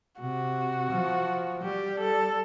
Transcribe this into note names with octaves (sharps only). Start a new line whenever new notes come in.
C3 F#4
F3
G3 G4
A4